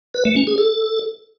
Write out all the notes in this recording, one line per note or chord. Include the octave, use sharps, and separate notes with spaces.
B4
A3
C#4
G#4
A4